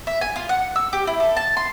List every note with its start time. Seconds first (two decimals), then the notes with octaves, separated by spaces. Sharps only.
0.07 E5
0.21 G#5
0.36 F4
0.49 F#5
0.76 E6
0.93 G4
1.07 E4
1.20 A4
1.37 A5
1.57 C6